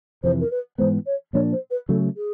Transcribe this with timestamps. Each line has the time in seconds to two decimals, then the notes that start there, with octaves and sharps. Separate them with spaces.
0.23 F2 C3 E3 C5
0.40 A#4
0.50 B4
0.78 G#2 E3 G#3 B3 C5
1.06 C#5
1.33 A#2 F3 A#3 D4 C#5
1.52 C5
1.70 B4
1.89 C#3 F#3 A3 A4
2.16 G#4